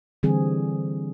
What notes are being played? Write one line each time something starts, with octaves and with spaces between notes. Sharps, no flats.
D3 E3 G3 C4 G#4